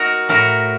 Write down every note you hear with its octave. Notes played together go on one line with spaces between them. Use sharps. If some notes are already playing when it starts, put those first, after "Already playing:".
Already playing: D#4 F#4 A#4
A2 F#4 A#4